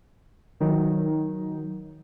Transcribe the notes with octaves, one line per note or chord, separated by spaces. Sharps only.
D#3 F#3 D#4